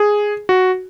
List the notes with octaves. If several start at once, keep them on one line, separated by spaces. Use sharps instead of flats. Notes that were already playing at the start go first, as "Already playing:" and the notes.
Already playing: G#4
F#4